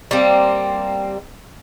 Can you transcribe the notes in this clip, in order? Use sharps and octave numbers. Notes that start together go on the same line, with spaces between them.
G3 A#3 C4